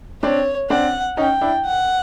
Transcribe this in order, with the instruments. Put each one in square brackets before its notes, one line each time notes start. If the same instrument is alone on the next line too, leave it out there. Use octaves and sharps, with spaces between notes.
[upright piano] C4 D4 [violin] C#5
[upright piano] C4 D4 [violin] F#5
[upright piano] C#4 D#4 [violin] G5
[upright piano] D4 E4
[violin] F#5